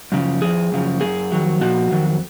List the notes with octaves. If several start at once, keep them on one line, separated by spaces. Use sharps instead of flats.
F#2 C#3 F3
F2 F3 G#4
F#2 C#3 F3
F#2 F3 G#4
F2 D#3 F#3
A#2 F3 F#4
F2 D#3 F#3